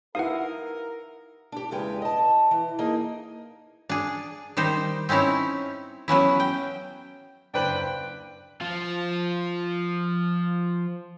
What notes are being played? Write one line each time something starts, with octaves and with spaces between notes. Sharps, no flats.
D#4 E4 G4 A#4 B4 F5 F#5 D#6
D4 G4
E2 C#3 G#3 G4 B4 G5
D#5 A5
E3
A#3 D#4 G#4 D#5
D4 G#4
D#3 G3 D#4 C5
C4 C#4 D#4 E4 C#5
F#3 B3 C#4 E4
G5
F#1 D4 B4 C5 G5 F#7
F3 F4